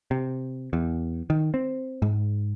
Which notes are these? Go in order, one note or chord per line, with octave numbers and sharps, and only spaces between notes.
C3
E2
D#3
C4
G#2